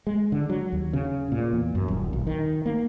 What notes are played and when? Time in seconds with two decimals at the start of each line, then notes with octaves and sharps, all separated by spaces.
0.07 G#3
0.32 D3
0.50 F#3
0.72 D#2
0.93 C#3
1.32 A#2
1.53 E2
1.75 F#2
1.88 D#1
2.13 B1
2.27 D#3
2.66 A#3